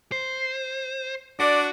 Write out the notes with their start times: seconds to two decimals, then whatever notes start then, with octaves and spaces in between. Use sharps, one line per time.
0.12 C5
1.40 D4 F#4 D5